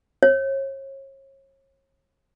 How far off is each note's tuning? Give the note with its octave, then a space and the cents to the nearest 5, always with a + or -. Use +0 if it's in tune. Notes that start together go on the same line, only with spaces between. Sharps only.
C#5 -35